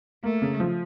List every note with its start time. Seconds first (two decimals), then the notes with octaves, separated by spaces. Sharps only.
0.24 A3 A#3
0.42 C#3
0.60 F3